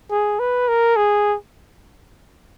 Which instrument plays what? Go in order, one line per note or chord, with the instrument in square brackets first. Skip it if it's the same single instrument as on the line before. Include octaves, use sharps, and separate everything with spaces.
[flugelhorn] G#4
B4
A#4
G#4